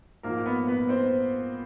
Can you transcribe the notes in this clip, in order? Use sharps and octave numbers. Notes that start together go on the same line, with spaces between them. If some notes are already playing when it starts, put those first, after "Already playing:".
G#2 F3 A#3 A#4
B3 B4
B3 B4
C4 C5